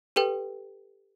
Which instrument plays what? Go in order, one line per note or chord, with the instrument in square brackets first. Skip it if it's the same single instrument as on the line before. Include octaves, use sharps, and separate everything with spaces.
[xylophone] G4 A4 B4 G5